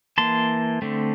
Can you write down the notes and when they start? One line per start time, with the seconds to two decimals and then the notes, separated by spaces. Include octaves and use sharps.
0.18 E3 A#3 A5 C6
0.82 D3 A3 C4